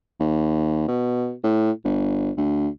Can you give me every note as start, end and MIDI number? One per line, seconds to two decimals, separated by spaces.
0.20 0.85 39
0.88 1.34 47
1.44 1.71 45
1.85 2.31 31
2.37 2.68 38